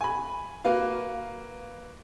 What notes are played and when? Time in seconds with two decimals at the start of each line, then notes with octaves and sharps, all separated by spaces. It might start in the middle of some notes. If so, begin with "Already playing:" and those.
0.01 G#5 B5
0.64 A#3 F#4 B4 F5